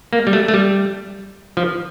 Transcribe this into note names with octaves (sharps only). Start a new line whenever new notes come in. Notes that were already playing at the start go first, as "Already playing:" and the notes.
A#3
G3
A3
A3
G3
F3